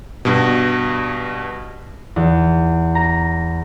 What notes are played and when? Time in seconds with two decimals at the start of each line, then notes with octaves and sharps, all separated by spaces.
0.25 G2 B2
2.16 E2
2.95 A#5